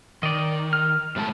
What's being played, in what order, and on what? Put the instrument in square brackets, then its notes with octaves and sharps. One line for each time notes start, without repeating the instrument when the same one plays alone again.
[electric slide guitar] D#3 [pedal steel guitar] D5 D#5
[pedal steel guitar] F6
[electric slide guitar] A2 G#3 A5